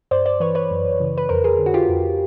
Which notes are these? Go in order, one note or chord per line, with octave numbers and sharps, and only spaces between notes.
G2 C5 D5
C5 D5
E3 B4 C#5
B4 C#5
F#2
C#3 E3
B4
F2 A#4 C5
G#4 A#4
D3
F#4
F4 G4
F2